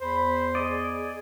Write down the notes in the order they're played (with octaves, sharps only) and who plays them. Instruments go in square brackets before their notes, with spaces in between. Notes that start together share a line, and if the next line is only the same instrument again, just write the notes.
[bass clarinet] E2 [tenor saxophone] C5 [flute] B5
[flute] G#4 [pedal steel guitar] D5 D#5